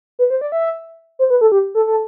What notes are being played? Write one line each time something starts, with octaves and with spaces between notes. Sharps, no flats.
B4
C5
D5
E5
C5
B4
A4
G4
A4
A4